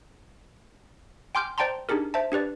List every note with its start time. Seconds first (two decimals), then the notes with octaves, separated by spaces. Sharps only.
1.35 G5 G#5 C6 D6 F6 G6
1.58 C5 D5 G5 A5 A#5 C6
1.89 D4 D#4 G4 G#4 A#4
2.14 C5 E5 A5
2.32 D4 G4 B4 D5